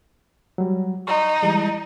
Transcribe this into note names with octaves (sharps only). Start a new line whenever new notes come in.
F#3 G3
D#4 C6 C#6
E3 G3 G#3